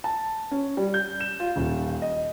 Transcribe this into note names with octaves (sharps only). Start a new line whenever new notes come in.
A5
C#4
G3
G6
E7
F4
D#1
D#5